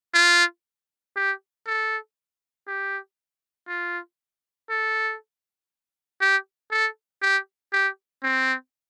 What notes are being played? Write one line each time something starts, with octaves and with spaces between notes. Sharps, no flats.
F4
G4
A4
G4
F4
A4
G4
A4
G4
G4
C4